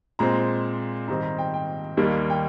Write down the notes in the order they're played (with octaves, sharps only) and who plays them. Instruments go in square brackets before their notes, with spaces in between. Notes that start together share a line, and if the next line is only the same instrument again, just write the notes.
[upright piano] A#2 G#3 C4 A#5
G#2 D#3 G3 C4 A#5
A#5
G5
G5
D#2 D#3 G3 A#3
G5